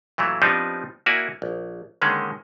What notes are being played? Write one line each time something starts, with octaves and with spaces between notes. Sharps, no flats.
A#2 E3 F#3 A3
F3 G3 B3 C4 D4 D#4
A#3 E4 F#4 D5 G#5
A#1
D3 D#3 G#3 A#3 C#4